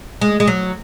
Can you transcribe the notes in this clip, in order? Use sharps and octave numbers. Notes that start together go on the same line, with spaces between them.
G#3
G#3
F#3